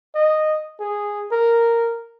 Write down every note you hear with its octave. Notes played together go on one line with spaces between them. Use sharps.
D#5
G#4
A#4